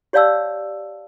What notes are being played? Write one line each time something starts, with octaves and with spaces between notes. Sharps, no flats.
G4 C#5 D5 F5 A5 E6